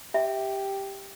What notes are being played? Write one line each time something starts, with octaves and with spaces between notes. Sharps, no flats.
G4 E5